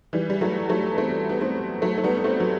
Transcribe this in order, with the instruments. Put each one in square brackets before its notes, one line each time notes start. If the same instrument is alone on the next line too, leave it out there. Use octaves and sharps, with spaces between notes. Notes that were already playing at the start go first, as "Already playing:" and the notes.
[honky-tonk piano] E3 G3
G3
F#3 A3
F#3 A3
B3
A3 C4
B3
A3 C4
F#3 A3
A3
G3 B3
B3
A3 C4
F#3